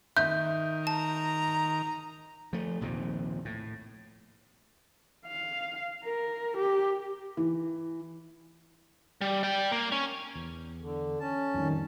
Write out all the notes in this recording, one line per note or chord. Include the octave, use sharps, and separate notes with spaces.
D#3 E5 G6
A5 A#5
F3 A3
A#1 D#2 C3 F3
A2
F5
A#4
G4
E3
G3
D5 G5
A#3
C#4
E2
D3
C#4 A5
F2 A2 D#3 G3